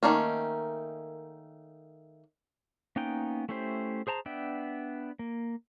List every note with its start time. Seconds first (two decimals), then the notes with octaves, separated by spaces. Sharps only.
0.03 D#3 A3 A#3 C#4
2.96 A#3 B3 C#4 D#4 G5
3.49 A3 C#4 E4 G4 C5
4.07 G#4 C5 A5 A#5
4.26 B3 D4 E5 G5
5.19 A#3